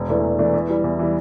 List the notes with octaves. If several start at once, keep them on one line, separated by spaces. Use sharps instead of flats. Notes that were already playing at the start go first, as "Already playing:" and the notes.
Already playing: E1
E2 E3 A3 D4
E1
E2 E3 A3 D4
E2
E3 G3
E2
E3 G3